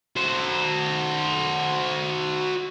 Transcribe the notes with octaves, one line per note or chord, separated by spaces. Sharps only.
F#4 C5